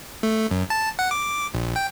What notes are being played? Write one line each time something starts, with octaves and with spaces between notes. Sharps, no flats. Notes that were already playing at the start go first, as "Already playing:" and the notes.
A3
F#2
A5
F#5
D6
A#1
G5